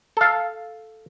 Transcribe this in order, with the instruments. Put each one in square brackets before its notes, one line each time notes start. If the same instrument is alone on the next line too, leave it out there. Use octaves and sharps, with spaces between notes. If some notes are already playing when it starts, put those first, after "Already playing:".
[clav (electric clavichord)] A4 F5